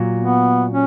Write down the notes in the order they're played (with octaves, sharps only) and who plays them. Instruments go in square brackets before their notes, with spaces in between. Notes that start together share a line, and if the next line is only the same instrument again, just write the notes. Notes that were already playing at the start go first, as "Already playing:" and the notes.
Already playing: [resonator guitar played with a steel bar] A#2 F#3
[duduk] B3
C#4